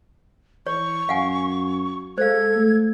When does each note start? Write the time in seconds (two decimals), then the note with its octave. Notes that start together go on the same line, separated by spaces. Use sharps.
0.67 E3 C#5 C#6
1.09 F#2 F5 F#5 G#5
2.18 G#3 A4 C5 F5 G#6
2.56 A3